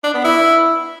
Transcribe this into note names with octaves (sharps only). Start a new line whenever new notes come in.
D4
B3
E4